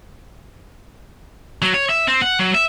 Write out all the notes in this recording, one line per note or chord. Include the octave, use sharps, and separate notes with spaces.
F#3
C#5
E5
C4
F#5
F#3
E5